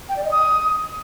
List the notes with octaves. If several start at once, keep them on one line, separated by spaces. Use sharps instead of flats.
G5
D5
D#5
D#6